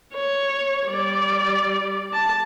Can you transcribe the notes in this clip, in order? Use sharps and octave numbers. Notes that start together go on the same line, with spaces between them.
C#5
G3 D5
A5